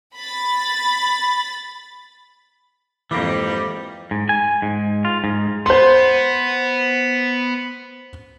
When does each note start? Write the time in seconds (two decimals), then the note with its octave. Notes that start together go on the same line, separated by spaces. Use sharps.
0.15 B5 A6
3.11 F2 G#2 E3 G3 A#3 D#4
4.11 G#2
4.29 G#5
4.62 G#2
5.05 F4
5.24 G#2
5.66 B3 C5 C6